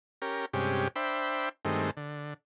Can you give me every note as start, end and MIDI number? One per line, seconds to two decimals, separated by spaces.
0.22 0.46 61
0.22 0.46 67
0.22 0.46 70
0.53 0.88 43
0.53 0.88 48
0.53 0.88 56
0.53 0.88 61
0.53 0.88 67
0.96 1.49 62
0.96 1.49 72
0.96 1.49 76
0.96 1.49 79
0.96 1.49 83
1.65 1.91 43
1.65 1.91 51
1.65 1.91 56
1.65 1.91 57
1.65 1.91 60
1.97 2.34 50